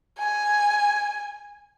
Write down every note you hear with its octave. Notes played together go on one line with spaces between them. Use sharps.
G#5